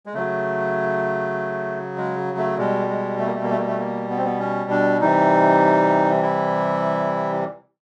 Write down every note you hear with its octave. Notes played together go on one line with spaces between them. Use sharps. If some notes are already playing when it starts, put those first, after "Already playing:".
G#3
C#3 F#3 A3
G#3
A3
B2 G3 G#3
G#3
A3
A#3
A3
A#3
A3
A#3
A3
A#3
B3
C4
B3
C#4
D4
C3 E3 G3 D#4
E4